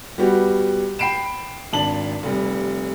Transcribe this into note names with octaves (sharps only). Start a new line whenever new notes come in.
G3 B3 F#4 G4
G5 B5 C7 D7 E7
G#1 D4 A5 F#7
F1 G3